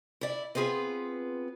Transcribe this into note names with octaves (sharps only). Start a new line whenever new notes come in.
E4 D5
B3 C4 F4 G#4 B4